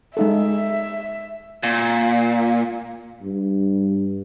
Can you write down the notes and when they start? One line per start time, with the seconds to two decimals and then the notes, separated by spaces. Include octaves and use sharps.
0.17 G#3 D#4 A4 E5
1.63 A#2
3.23 G2